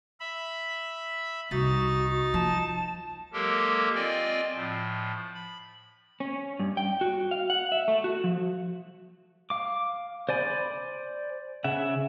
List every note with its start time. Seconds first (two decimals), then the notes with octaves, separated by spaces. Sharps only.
0.20 E5 B5
1.51 C2 D#4 F#4 A6
2.34 F3 A5
3.33 F#3 G#3 A#3 G4 A4 A#4
3.95 C4 F4 D5 D#5 G5 G#5
4.55 A2 F3
5.34 B5
6.20 C#4
6.60 G2
6.77 G5
7.01 F#4
7.31 F5
7.50 F#5
7.72 E5
7.88 A3
8.04 F#4
8.24 F3
9.50 F5 D6
10.29 C5 D5 G#5 B5
11.64 C#3 E5 F#5